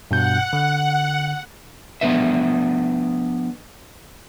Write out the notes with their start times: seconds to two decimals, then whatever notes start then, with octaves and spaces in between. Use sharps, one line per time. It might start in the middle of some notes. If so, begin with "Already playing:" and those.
0.11 G2 B2 F#5 G6
0.53 D3
2.01 F3 B3 C4 D4 B4 E5